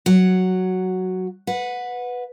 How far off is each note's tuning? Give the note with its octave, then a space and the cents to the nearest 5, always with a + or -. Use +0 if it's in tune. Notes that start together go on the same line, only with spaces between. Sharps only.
F#3 +0 F#5 +0
B4 +5 F#5 -20